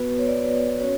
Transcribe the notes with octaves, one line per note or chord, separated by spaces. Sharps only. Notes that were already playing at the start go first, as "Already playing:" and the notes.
Already playing: B3 F#4 B4
C#5
D5
C#4 F#4 C#5